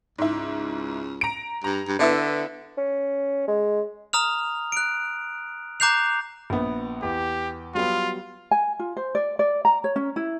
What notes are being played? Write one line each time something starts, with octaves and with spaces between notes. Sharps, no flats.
C#2 G#2 E4
A#5 D7
G2 A#5
G2
D3 B3 E4 E5
C#4
G#3
A#5 D#6 F6 F7
F#6 D7
A#5 D6 F#6 G6 C7 F7
A#1 B3
E2 G4
F#3 G3 B3 F4
G#5
F4
C5
D5
D5
A#5
C#5
C#4
E4